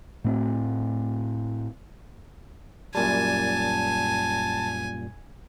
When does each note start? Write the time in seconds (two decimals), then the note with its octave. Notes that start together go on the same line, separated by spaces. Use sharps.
0.24 A2 A3 C4
2.95 F#2 A#2 G3 G#5 A5